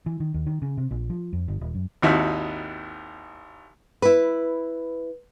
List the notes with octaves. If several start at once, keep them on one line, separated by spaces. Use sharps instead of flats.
E3
D#3
D#2
D#3
C#3
C3
A#1
F3
F2
G1
D#1
F#2
G#1 D#2 D#4 E4 F#4
E4 B4